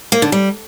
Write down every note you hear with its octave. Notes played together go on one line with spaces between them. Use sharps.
A#3
D3
G3